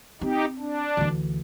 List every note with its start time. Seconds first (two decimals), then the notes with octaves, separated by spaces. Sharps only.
0.21 C4 D#4 G4
0.59 D4
0.97 D2 E3